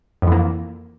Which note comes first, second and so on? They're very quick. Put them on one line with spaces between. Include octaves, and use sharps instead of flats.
F2 E3 A#3